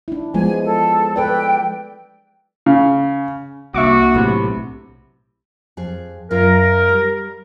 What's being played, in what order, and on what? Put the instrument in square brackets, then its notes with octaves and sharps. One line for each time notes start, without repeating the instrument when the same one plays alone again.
[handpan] D4 E4
[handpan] F3 G#3 B3 [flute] G#5
[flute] A4
[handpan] A4 B4 D5 [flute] G5
[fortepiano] C#3
[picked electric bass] C2 [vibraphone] A#3 D4 [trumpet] F#4 [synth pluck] E5 C#6 D6
[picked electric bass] B1 A2 C3 [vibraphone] B5
[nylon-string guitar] F2 G#4
[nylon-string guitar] F#2 F4 [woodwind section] A#4
[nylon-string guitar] G3